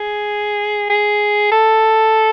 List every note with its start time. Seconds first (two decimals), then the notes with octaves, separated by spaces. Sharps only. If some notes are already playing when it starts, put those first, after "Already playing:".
Already playing: G#4
0.90 G#4
1.52 A4